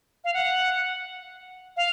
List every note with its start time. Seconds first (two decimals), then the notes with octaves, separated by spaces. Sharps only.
0.24 F5
0.34 F#5
1.77 F5